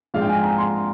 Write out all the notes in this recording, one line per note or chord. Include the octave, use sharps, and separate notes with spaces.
G#2 F3 G#3 D4 F5
G5
G#5
A#5
C6